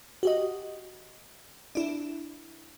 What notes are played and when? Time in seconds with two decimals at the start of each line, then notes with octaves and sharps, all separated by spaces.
0.23 F#4 G4 D#5
1.75 D4 E4